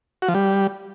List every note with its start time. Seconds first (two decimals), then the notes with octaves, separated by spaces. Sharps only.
0.22 F#4
0.28 F3
0.35 G3